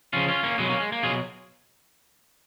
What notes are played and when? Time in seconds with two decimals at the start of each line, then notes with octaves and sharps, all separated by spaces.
0.13 C#3 F3 C#4 F4
0.28 C#4 F4
0.43 A#3 C#4
0.58 B2 F#3 G#3 B3
0.69 A#3 C#4
0.80 G#3
0.92 A#3
1.03 B2 F#3 F4 G#4